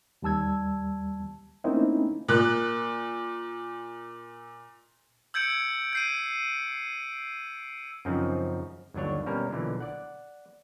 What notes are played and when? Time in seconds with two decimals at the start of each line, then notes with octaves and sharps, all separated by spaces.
0.22 D#2 G3 A5 E6 G#6
1.64 A3 A#3 C4 C#4 D#4 E4
2.28 A#2 F#6
5.34 E6 G6 G#6 C#7 D7
5.93 G6 C7 D#7
8.05 F#2 C#3 F3 C4 D#4
8.94 G1 D#2 F#3 D4 C#5
9.26 B2 G3 A#3 C#4 A#4
9.50 B1 A#2 D3 E3
9.80 D5 F#5